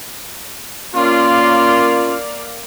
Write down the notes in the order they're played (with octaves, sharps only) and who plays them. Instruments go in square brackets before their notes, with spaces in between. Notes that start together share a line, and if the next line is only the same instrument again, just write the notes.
[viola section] A#3 D5 F5 [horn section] C#4 F4